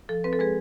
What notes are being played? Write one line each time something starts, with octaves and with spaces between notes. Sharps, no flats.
F3 A4
C4 B4
A4
G#3 G#4 B4